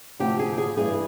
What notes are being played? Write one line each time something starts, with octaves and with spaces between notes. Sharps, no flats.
D2 C3 F3 G4
G#4
G#4
G2 E3 G3 G#4